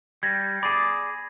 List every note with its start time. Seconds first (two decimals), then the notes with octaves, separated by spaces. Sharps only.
0.23 G3 G#6 A#6
0.63 G#4 D5 B5